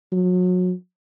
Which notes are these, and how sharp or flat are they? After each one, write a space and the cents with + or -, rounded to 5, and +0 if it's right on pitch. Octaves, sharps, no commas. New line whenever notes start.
F#3 -30